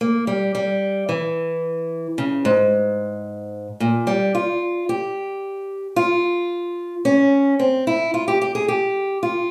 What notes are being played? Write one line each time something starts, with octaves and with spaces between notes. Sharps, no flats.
A#3
G3
G3
E3
C#3
G#2
A#2
G3
F4
G4
F4
C#4
C4
E4
F4
G4
G4
G#4
G4
F4